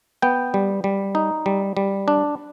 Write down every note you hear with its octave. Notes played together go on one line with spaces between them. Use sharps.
B3 G5
G3
G3
D#4
G3
G3
D4